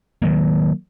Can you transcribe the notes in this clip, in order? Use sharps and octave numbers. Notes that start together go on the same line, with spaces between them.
D#3 F#3 A#3